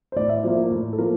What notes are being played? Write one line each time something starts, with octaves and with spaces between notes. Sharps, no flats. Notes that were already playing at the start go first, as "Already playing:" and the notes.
C5
A2 D5
E5
D5
F3 A#3 C5
A#4
A2
A4
F3 A#3 A#4